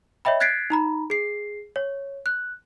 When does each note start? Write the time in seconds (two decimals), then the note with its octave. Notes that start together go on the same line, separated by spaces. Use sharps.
0.25 C#5 D#5 E5 G5 B5
0.40 F#6 G#6 A6 B6 C7 D7
0.70 D#4 A#5 B5
1.10 G#4 C7
1.76 C#5
2.26 F#6